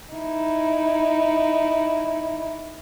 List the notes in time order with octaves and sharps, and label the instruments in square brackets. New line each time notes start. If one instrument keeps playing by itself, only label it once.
[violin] D#4 E4